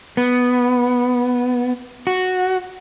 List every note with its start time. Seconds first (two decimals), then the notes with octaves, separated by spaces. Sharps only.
0.17 B3
2.07 F#4